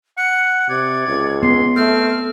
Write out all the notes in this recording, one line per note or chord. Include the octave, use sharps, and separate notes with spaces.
F#5 C#7
C3 D5 G#6
C#2
B3 C6
A3 C4 F6